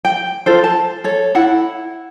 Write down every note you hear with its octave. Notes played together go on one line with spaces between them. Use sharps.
G5
F4 A4 C5
A5
A4 C#5
E4 F#5 B5